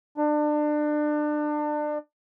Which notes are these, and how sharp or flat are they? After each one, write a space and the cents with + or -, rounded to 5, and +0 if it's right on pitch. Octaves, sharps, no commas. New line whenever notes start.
D4 +30